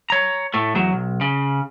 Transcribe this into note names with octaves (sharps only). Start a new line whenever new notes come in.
C#5 A#5
A2 A3
E2 F#3
B1
C#3